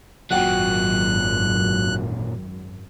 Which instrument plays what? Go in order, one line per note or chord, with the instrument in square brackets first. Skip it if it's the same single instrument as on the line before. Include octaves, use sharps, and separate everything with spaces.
[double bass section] G#1 F#2 [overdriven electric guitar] A#2 F#3 [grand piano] F#4 F#5 G5 [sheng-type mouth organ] F#6